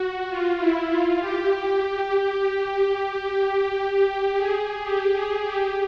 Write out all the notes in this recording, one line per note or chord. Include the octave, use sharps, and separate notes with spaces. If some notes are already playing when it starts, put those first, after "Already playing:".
Already playing: F#4
F4
E4
F4
G4
G4
G#4
G4
G#4
G4